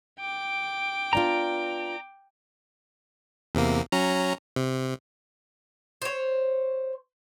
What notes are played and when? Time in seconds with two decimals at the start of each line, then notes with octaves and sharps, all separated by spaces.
0.20 G5 D6
1.13 B3 D4 F4 A#5
3.55 E2 C3 A#3
3.92 F#3 C#4 A#5
4.56 C3
6.02 C5 C#5